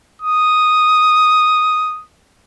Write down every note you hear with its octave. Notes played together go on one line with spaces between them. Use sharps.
D#6